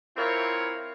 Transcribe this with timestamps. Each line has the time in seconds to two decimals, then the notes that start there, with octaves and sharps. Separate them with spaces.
0.17 C4 E4 F4 A#4 C#5